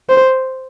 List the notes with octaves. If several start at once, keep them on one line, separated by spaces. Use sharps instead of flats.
C5